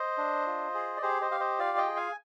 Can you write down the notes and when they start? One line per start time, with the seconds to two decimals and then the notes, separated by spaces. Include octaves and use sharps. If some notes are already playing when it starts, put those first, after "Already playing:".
Already playing: C5 D#5
0.18 D4
0.47 F4
0.75 G#4
0.96 D5
1.02 G4 G#4 C5
1.21 C5 D#5
1.31 G4 F5
1.40 C5 D#5
1.59 F4 D5 F5
1.78 D#5 G5
1.87 G#4
1.96 F5 G#5